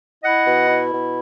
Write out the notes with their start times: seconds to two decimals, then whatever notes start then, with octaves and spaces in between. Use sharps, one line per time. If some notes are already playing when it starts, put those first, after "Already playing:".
0.23 E4 D#5 F#5
0.46 B2
0.69 E4
0.93 B2